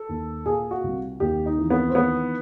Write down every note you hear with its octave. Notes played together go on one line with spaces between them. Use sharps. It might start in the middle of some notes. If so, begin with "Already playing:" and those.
Already playing: A4
D#2
A#2 G#4
F#4
C2
D#2 G4
D#4
E3
B3
C4
D#3 B3